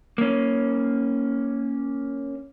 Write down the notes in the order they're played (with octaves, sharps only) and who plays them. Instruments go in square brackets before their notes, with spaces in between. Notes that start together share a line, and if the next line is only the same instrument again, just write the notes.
[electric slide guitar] A#3 C#4